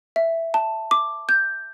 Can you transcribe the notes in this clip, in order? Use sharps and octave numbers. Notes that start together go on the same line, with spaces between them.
E5
A5
D6
G6